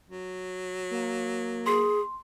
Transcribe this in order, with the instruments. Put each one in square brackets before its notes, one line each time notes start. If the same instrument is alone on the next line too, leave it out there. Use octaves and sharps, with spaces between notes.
[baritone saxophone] F#3
[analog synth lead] A#3
[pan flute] G#4 [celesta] C6